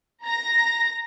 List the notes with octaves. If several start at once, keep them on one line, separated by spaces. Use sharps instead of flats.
A#5 A#6